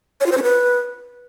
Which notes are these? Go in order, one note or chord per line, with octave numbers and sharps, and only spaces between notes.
C#5
F4
C5
C#4
B4